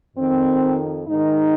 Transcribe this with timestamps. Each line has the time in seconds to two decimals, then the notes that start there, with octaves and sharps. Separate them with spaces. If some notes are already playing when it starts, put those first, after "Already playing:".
0.16 F2 D#3 C4
1.08 G#2 D#3 D#4